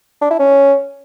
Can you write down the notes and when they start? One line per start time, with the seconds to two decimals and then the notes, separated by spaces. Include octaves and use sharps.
0.21 D4
0.30 E4
0.39 C#4